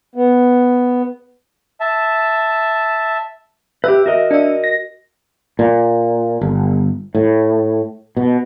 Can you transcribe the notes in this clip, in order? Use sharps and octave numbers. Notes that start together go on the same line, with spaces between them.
B3
E5 A5
G4 B4 E5
F#4 A#4 D#5
D4 E5
A#6
A#2
G1
A2
B2